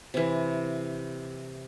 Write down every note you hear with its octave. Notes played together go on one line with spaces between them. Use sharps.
C3 E3